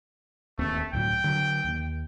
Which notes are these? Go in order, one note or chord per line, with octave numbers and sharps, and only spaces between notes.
D1 D#2 A3 C4
D2 A2 F#3 G5
D3 F#3
D#2